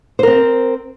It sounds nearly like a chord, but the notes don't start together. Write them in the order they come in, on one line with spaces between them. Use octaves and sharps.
C5 A#4 C4